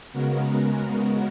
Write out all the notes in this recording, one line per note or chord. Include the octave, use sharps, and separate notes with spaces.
C#3 G#3 B3 F#4 A#4